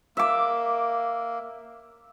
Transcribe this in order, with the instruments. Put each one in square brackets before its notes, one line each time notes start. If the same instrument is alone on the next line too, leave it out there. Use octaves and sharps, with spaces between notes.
[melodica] A#3 [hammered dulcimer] E5 D6